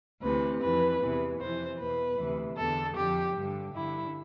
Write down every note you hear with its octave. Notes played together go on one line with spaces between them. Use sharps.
D2 C3 E3 B4
F2 E3 B4
E2 C3 E3
F2 C3 E3 C5
E2 B2 B4
D2 C3 E3
E2 D3 A4
F2 D3 G4
G2 D3
G2 D3 E4